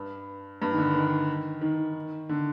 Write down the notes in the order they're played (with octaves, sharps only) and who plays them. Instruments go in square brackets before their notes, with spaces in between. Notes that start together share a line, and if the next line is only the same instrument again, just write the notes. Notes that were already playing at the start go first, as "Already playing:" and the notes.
Already playing: [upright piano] G2
G2
D#3
D3
D#3
D#3
D3